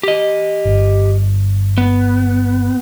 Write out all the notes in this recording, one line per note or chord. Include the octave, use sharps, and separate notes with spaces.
G4 D#5
G1
B3